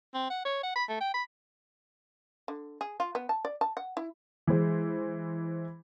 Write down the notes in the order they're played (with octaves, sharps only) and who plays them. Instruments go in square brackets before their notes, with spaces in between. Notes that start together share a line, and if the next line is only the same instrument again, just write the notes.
[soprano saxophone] C4
F#5
C#5
F#5
B5
A3
G5
B5
[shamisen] D3
G#4
F4
B3
A5
D5
A5
F#5
E4
[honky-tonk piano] E3 G#3 C5